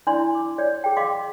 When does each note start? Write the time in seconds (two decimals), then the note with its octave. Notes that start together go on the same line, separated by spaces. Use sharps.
0.07 D4 E4 D5 C6
0.35 D6
0.58 C#5 D5
0.84 G#4 G5
0.97 D#5 F5 C6 D6